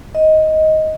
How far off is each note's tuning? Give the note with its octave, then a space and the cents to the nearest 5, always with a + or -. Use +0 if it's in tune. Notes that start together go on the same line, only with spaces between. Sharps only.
D#5 +10